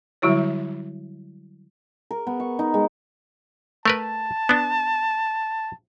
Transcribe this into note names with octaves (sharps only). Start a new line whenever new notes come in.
D3 F#3 G3 E4 F#4 C#5
A#4
B3
C#6
D#4
G#3
A3 A#4 B4 A5
B3 D4